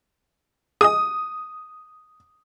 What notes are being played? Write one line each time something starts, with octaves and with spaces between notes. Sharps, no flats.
G#4 D#5 D#6